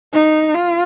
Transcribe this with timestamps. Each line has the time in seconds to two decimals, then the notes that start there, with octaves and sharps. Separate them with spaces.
0.13 D#4
0.54 F4